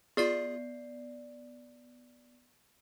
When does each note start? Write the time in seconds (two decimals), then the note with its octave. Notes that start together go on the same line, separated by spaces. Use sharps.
0.17 B3 F4 G#4 D5 C7